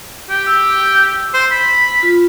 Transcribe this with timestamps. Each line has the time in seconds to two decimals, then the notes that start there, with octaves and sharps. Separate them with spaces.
0.30 G4
0.47 E6
1.34 C5
1.51 B5
2.03 F4